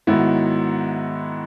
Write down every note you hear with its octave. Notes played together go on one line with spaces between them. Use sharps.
G#2 D#3 F#3 B3 E4